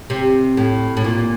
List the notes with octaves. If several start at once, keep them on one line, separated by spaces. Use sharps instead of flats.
C3
A2
A2
A#2